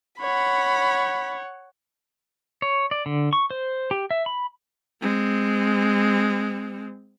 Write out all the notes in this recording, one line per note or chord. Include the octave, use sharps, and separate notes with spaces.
C#5 F#5 B5
C#5
D5
D3
C#6
C5
G4
E5
B5
G#3 C4